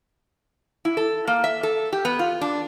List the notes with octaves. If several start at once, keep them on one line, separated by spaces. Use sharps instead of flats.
E4
A4
A#3
E5
A4
G4
B3
F4
D4